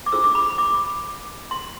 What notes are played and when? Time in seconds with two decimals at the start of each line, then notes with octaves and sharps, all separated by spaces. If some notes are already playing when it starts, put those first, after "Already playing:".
0.06 D6
0.12 D4 F4 G#4 C5 E6
0.24 D6
0.35 B5
0.46 B5
0.58 D6
1.51 C6